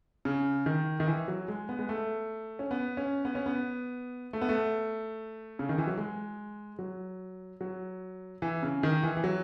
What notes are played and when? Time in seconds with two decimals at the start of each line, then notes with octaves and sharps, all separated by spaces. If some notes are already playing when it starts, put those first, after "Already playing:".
0.25 C#3
0.66 D#3
1.00 D#3
1.07 E3
1.28 F#3
1.48 G#3
1.69 B3
1.79 G#3
1.89 A3
2.59 C#4
2.71 B3
2.97 C#4
3.25 B3
3.35 C#4
3.46 B3
4.33 A3
4.41 B3
4.49 A3
5.59 C#3
5.69 D#3
5.78 E3
5.87 F#3
5.97 G#3
6.79 F#3
7.61 F#3
8.42 E3
8.63 C#3
8.83 D#3
9.03 E3
9.17 E3
9.24 F#3